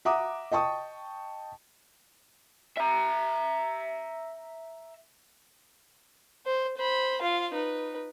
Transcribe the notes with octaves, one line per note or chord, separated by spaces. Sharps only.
E5 F#5 A#5 D6 D#6
D#5 G5 A5 C#6 D#6
E5 A#5
C5
C5 B5
F4 F5
D#4 B4